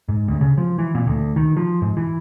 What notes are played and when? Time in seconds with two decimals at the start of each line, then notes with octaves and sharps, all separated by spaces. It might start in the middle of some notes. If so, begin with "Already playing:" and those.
0.09 G#2
0.28 D2
0.41 C#3
0.58 F3
0.78 E3
0.95 A#2
1.07 D2
1.36 D#3
1.57 F3
1.82 G#2
1.97 E3